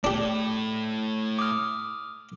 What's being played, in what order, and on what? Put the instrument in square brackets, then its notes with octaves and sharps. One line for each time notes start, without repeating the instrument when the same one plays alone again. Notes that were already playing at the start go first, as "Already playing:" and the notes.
[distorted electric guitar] A2 [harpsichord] D4 G4
[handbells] D6 D#6 F6